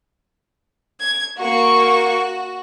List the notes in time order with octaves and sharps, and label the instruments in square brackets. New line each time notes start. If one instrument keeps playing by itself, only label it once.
[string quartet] G#6
[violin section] A#3 C#6 [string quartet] F#4